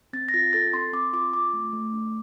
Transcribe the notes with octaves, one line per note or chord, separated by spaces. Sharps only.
C4 A6
A#6
F4 A6
A4 A6
C4 C6
C4 D6
F4 D6
F4 D6
A3
A3
D4